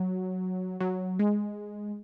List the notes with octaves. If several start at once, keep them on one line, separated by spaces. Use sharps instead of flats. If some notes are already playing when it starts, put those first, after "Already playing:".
Already playing: F#3
F#3
G#3